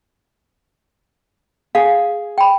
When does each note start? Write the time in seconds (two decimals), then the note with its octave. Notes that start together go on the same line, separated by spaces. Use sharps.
1.75 G#4 F5
2.38 G5 B5